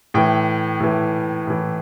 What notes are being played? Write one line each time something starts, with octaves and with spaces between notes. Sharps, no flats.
A2 E3 G5
A2 E3
A2 E3